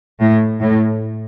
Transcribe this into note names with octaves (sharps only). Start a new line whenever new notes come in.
A2
A2